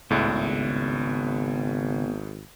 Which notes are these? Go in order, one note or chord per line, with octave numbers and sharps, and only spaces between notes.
G#1 C#2 A2 C#3 B3 D5 E5